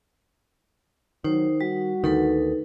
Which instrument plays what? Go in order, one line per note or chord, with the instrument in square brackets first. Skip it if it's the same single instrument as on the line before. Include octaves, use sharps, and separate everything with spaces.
[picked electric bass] D#3 [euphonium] F#3 [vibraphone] D#4 C5
[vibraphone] G3 [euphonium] F#4
[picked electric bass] D2 D#3 [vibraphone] D#4 A4 B4